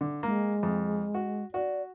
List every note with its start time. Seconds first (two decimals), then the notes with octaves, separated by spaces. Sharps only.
0.01 D3
0.23 G#3 A#3
0.63 F2
1.14 F#4
1.54 F#4 D5